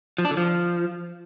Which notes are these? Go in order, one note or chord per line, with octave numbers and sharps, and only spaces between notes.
F3
D4
D3
F3